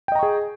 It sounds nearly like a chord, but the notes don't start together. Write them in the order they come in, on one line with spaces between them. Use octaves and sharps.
G5 D#5 A#5 C#6 G#4